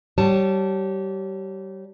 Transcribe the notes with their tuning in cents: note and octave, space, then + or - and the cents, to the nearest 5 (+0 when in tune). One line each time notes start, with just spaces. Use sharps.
G3 -25 C#5 -20 A5 +0